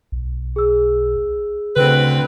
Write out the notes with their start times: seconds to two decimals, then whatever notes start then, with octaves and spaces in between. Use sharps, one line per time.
0.12 B1
0.56 G#4 E6
1.76 D2 C#3 C4 B4